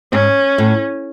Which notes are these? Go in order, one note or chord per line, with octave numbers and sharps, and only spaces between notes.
G#2 C#4
A2